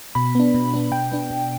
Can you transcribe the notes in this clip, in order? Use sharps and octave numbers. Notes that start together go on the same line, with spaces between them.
B2 B5
B3 D4
B2
B3 D4
B2 G5
B3 D4
B2